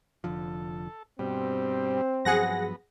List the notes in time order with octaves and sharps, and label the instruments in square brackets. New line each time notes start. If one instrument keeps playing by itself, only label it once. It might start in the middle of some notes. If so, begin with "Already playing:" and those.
[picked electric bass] F1 D3 F3 [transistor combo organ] A4
[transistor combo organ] G2 G3 [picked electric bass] B2 [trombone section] C4
[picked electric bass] G2 F3 F#3 [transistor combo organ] B3 [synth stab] G#4 F#5 A#6